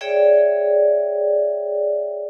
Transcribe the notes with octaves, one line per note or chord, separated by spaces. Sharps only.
G#4 C#5 D5 E5 G5